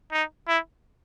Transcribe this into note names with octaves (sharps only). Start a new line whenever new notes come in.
D#4
E4